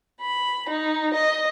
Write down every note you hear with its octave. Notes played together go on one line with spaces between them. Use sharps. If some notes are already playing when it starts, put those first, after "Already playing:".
B5
D#4
D#5